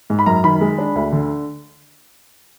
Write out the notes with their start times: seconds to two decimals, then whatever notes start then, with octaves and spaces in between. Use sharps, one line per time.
0.10 G#2
0.19 B5
0.26 F#2 A#5
0.44 D#3 B5
0.61 G#3
0.78 D4
0.95 D2
1.13 D3